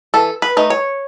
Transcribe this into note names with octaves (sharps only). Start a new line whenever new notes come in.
E3 A4
B4
A3 D#4
C#5